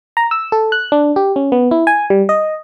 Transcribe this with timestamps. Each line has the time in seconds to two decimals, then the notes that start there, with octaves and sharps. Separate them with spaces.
0.17 A#5
0.31 E6
0.52 A4
0.72 F#6
0.92 D4
1.16 G4
1.36 C#4
1.52 B3
1.71 E4
1.87 G#5
2.10 G3
2.29 D#5